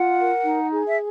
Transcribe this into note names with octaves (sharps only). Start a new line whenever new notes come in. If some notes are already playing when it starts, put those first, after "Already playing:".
Already playing: F4 F#5
A#4
D#4
G#4
E5